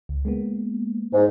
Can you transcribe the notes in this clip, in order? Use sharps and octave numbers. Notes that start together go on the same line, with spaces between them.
C#2
G#3 A#3 B3
G#2